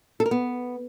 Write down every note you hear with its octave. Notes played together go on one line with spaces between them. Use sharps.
A4
A#4
B3